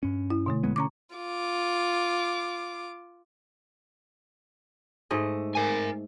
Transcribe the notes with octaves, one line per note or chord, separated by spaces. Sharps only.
G2 C#4
E4
B2 D3 A3
E1 G#3 B3
D3 C#4 A#5 C#6 D6
F4 D6
G#2 A3 D#5
A#4 G#5